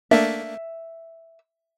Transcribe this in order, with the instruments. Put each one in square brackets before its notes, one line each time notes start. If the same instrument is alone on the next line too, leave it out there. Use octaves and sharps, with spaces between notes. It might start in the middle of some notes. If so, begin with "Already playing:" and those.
[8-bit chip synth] A3 A#3 D4 [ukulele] E5